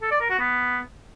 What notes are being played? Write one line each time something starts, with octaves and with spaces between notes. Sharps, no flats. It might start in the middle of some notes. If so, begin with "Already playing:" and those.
A4
D5
A#4
F#4
B3